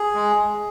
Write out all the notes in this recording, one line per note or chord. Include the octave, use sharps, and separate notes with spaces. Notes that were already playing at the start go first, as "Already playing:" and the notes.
Already playing: G#4
G#3
G#3